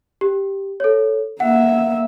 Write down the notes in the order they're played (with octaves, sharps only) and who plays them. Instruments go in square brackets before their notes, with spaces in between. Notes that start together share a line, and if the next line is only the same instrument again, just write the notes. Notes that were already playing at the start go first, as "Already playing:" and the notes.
[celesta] G4
A4 C#5
[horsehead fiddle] A#3 E5 [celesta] F#5